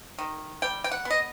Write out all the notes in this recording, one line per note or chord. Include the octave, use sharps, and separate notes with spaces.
D#3
G3 G5
G5
F#5
B3
D#5